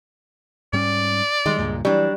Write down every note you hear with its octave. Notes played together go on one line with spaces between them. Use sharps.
G#2 G3 C#4 D5
D#3 G3 G#3
C#2 G2 A#2
E3 F#3 G3 D4